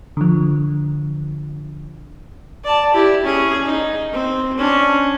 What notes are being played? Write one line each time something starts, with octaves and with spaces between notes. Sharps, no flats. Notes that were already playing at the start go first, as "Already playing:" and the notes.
D3 F3
D5 A5
E4 G4
C#4 G#4
D#4
C4
C#4 D4